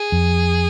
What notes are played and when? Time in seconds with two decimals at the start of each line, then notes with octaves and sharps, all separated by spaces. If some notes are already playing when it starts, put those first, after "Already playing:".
Already playing: G#4
0.12 F2